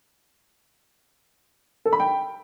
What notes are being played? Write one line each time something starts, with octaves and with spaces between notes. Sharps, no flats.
A4
B5
G5